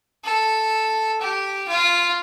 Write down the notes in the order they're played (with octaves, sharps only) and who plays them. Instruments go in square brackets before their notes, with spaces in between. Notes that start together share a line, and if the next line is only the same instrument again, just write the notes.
[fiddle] A4
G4
F4